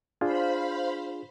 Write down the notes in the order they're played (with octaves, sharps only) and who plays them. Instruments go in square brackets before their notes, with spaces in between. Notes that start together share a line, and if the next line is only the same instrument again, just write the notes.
[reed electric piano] D4 F4 G#4 [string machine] C5 F5 B5